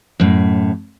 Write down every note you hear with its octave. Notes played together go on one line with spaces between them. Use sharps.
F#2 A2